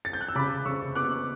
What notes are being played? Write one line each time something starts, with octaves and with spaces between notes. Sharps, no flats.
A6
G6
F#6
E6
C#3 B5 D6
C#3 C#6 E6
B3 D6 F#6